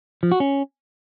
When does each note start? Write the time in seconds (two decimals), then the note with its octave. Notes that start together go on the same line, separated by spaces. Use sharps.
0.23 F3
0.32 F#4
0.40 C#4